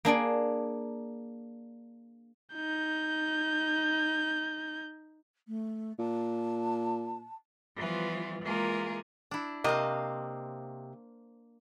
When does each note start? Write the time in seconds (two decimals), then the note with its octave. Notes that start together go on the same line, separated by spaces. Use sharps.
0.05 A#3 D4 G#4 D5
2.55 D#4 G6
5.48 A3
5.99 A#2 A5
7.77 E3 F3 G3 B3 F4
8.43 E3 G#3 A#3 F4 G#4 A#4
9.31 D4 E4
9.64 C3 A#3 C5 D#5 F5